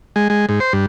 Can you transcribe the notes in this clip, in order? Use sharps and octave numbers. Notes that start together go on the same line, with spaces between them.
G#3
G#3
G#2
C5
G2